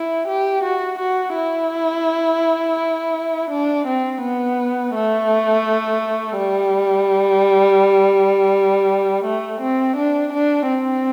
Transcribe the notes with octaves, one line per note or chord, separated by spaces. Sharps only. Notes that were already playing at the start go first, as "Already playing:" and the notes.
Already playing: E4
G4
F#4
F#4
E4
D4
C4
B3
A3
G3
A3
C4
D4
D4
C4